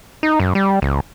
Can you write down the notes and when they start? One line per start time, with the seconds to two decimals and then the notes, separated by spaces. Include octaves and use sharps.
0.23 D#4
0.40 F#2
0.55 G3
0.82 C#2